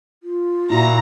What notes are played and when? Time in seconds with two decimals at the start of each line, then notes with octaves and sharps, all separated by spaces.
0.23 F4
0.70 A#2 E4 F#4 A#5